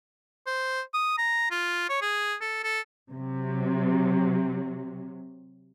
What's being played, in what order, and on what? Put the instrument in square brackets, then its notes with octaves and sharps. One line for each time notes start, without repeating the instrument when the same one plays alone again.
[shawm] C5
D#6
A#5
F4
C#5
G#4
A4
A4
[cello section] C3 F#3